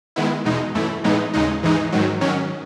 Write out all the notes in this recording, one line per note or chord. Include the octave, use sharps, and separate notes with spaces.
D#3 G#3 B3 E4
E2 B2 G#3 D#4
F#2 E3 A3 E4
A2 E3 G#3 B3 D#4
D#2 C#3 G#3 D#4
G#2 E3 G#3 D#4
G#2 D#3 F#3
D#3 F#3 C#4